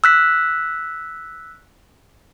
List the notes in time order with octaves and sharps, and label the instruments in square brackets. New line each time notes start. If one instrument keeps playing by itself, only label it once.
[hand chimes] E6 F#6 B6